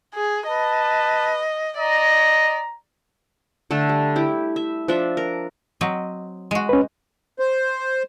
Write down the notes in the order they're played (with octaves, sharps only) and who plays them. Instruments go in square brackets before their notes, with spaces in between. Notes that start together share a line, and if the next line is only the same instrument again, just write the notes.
[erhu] G#4
[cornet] B4 [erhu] D#5 [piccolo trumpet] A5
[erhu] D5 [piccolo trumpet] D#5 [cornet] A#5
[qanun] D3 A3 A4
G3
E4 G4
E5
F3 D4 E5
A#4
[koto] F#3 C4 D#5
G#3 F#4
[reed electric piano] C#4 B4
[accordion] C5